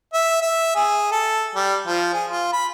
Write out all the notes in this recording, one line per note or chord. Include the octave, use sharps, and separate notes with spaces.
E5
E5
G#4
A4
G3
F3
G#4
F4
B5